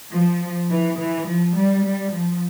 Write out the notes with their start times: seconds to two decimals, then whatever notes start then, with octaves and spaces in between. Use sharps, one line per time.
0.11 F3
0.69 E3
0.98 E3
1.27 F3
1.55 G3
1.84 G3
2.12 F3